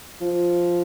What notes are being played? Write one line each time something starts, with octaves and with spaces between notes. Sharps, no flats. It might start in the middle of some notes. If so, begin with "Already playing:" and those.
F3